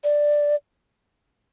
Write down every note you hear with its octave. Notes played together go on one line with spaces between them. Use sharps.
D5